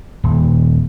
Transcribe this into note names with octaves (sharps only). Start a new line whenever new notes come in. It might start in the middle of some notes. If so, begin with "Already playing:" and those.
D#1